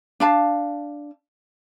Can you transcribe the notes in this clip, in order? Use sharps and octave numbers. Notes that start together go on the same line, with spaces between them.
D4 F5 A5